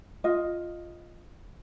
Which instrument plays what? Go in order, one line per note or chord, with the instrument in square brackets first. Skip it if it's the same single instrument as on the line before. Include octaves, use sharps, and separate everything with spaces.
[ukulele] F4 D#5